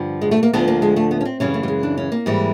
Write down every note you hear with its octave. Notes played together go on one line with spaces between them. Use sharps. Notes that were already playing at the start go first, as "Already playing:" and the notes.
Already playing: G2 D3 F3
G#3
A3
A#3
D2 D3 F3 B3
A#3
G#3
A3
B3
C#4
C4
F#2 C#3 E3 G3 C#4
A3
G3
G#3
D4
C#4
A#3
G#2 E3 G3